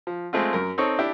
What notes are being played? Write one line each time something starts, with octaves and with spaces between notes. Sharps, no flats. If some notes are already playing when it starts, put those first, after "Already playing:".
F3
G#3 A3 C4 F4
F#2 A#4
C4 D#4 A4 C#5
D4 E4 G4